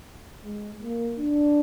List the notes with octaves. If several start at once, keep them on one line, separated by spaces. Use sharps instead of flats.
G#3
A#3
D4